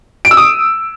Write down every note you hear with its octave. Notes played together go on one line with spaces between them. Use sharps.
D7
E6
D#6